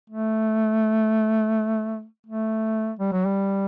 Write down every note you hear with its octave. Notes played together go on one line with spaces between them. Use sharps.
A3
A3
G3
F#3
G3